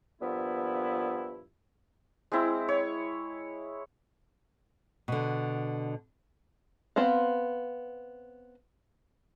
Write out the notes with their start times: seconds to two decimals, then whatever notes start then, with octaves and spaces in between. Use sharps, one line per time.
0.21 G2 A#2 F3 B3 E4
2.32 G#3 C4 E4
2.69 C#5
5.08 B2 D3
6.96 B3 C4 C5 F5